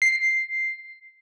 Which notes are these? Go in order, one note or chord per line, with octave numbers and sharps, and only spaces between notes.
C7